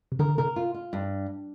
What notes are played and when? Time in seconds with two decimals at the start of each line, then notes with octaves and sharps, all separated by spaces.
0.12 C3
0.19 D3 A#4
0.38 C3 A#4
0.56 F4
0.74 F4
0.93 G2